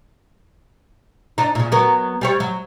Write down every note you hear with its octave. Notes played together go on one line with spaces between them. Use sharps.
D4 D#4
A#2 C#3
F#3 B3 A#4
G3 G4 C#5
F#3